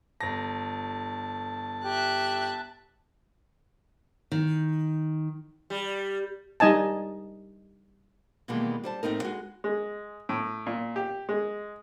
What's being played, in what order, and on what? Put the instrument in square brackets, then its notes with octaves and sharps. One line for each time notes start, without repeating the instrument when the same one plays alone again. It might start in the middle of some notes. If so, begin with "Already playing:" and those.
[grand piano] G1 A#6 [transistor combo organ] A5
[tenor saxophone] G4 [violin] E5 F#6
[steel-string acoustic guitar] D#3
[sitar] G3
[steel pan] G3 D#4 D#5 G#5 A5
[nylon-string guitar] B2 D#3 E3 G3 G#3 A#3
G3 C5 A5
A2 C4 D#4 A#4
G#3 F#4
[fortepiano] G#3
A2
A#2
G4
G#3